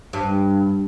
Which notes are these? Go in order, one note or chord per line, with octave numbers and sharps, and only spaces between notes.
G2